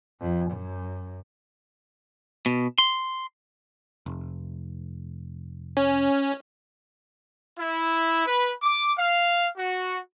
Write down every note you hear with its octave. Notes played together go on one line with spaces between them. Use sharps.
F2
F#2
B2
C6
F1
C#4
E4
B4
D6
F5
F#4